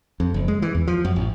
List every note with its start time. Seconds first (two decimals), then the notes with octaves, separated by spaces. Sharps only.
0.20 F2
0.34 F#1
0.48 G#3
0.62 E3
0.75 E2
0.87 F3
1.05 F#2
1.16 A1